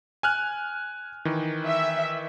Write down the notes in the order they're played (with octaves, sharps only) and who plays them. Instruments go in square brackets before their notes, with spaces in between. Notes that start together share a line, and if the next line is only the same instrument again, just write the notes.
[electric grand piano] G#5 F6 F#6
D#3 E3
[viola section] E5